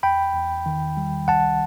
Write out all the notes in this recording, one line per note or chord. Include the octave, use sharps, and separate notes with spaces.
E2 G5 B5
E2
D#3
G3
C2 F#5 A5